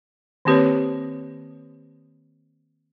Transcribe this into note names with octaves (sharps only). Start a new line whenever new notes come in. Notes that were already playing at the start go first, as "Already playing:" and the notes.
D#3 A#3 C4 G4 B4 C#5